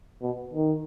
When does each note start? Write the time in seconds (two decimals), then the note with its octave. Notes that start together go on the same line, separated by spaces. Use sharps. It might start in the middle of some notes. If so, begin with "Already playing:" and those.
0.22 B2
0.53 D#3